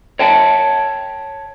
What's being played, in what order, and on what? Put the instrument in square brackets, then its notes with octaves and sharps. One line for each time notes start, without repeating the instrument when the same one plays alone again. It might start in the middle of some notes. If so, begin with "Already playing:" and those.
[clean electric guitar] C#5 G5 A5